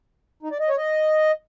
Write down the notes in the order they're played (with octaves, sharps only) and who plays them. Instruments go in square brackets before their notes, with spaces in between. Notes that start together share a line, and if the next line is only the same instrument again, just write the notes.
[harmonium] D#4
D5
D#5
C#5
D#5